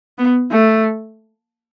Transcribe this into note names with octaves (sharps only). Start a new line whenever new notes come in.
B3
A3